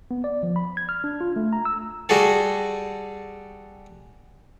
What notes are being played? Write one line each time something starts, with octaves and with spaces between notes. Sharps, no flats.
B3
D5
F3
B5
G#6
F6
D4
F4
A3
A#5
E6
G3 F#4 G#4 A4